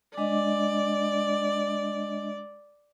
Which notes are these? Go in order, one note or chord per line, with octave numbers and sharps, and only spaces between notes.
G#3 D4 D5 D#5